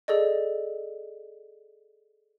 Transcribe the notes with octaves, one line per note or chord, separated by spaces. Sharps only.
G#4 A4 D5 D#5